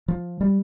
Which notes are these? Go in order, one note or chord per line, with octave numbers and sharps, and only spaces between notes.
F3
G3